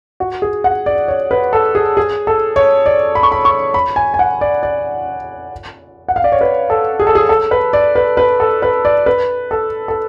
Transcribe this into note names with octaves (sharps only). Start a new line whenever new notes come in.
F#4
G#4
F#5
D5
C#5
B4
A4
G#4
G#4
A4
C#5
D5
B5
C#6
B5
C#6
B5
G#5
G#5
F#5
D5
D5
F#5
F5
D5
C#5
B4
A4
G#4
A4
G#4
A4
B4
D5
B4
B4
A4
B4
D5
B4
A4
A4